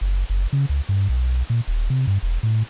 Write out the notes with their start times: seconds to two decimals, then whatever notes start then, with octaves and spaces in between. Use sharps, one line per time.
0.01 F#1
0.30 F#1
0.53 C#3
0.69 C#2
0.89 G2
1.09 B1
1.50 A#2
1.67 D#1
1.90 C3
2.07 G2
2.23 E1
2.43 A2